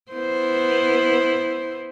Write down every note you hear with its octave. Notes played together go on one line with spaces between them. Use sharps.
B3 E4 C5